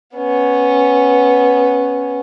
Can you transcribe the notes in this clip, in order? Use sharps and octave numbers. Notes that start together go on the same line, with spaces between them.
B3 C#4